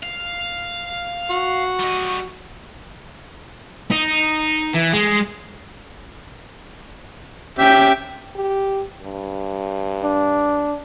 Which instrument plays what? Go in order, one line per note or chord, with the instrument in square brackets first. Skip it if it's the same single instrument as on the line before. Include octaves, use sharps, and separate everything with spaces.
[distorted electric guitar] F5
[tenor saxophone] F#4
[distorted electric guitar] G3 D#5
D#4
E3
G#3
[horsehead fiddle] C#4 G5 [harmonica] G4 E5
[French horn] G4
G2
[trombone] D4